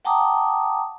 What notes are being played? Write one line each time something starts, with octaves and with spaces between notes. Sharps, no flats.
F#5 G5 A5 A#5 D6 D#6